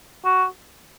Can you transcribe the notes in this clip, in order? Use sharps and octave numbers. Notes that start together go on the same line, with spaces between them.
F#4